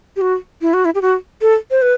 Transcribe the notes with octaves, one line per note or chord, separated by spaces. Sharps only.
G4
F#4
E4
F#4
E4
G4
F#4
A4
C5
B4